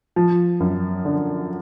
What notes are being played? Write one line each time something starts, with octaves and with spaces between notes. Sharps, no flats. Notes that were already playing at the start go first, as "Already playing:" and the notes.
F3
F#2
D3